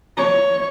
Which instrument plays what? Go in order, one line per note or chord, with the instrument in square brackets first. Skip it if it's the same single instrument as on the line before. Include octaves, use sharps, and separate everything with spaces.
[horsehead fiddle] C#5